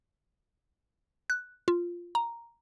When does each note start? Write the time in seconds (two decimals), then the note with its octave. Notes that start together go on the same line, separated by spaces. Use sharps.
1.30 F#6
1.68 F4
2.15 A#5